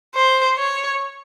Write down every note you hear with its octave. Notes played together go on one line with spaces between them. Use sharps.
C5
C#5